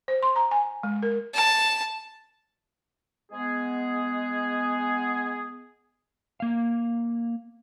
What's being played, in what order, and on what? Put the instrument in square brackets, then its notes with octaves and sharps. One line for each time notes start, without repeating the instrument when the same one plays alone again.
[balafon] C5
C6
A#5
G#5
G#3
A#4
[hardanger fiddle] A5
[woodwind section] G#3 B3 G#4
[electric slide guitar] A#3 F5